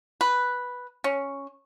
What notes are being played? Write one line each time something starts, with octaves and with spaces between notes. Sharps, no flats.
B4
C#4